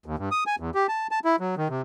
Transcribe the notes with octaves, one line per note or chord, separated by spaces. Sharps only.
D#2
G2
D#6
G#5
E2
G4
A5
A5
E4
F#3
D#3
C3